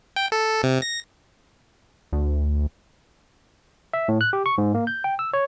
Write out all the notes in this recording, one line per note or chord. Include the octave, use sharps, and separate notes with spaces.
G5
A4
C3
A#6
D2
E5
A2
F#6
G4
C#6
G#2
A#3
G6
G5
E6
C#5